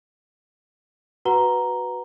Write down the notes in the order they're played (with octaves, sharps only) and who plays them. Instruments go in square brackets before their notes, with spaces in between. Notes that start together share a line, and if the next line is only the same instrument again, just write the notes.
[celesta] F#4 B4 F#5 A#5 G7